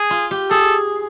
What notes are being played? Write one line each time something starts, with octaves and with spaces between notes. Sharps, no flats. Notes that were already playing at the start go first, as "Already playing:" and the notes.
Already playing: G#4
F4
G4
G#4 A4